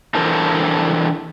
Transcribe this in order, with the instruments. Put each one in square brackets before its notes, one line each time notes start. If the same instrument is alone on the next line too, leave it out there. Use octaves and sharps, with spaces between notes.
[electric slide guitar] E3 D4 A4 A#4 C5